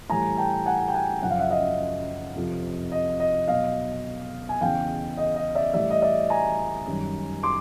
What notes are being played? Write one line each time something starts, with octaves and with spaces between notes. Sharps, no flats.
A2 E3 G3 G#5 A#5
G5 A5
F#5 G#5
G5
F#5 G#5
F#2 C#3 F3 F#5
F5
E5 F#5
D#5 F5
F2 C3 F3
D#5
D#5
B2 F#3 D#5 F5
G#5
E2 C#3 E3 F5 G5
D#5
D#5
D5 E5
A2 E3 G3 D5 E5
D#5
D5 E5
G#5 A#5
F#2 D#3 G3
C6 D6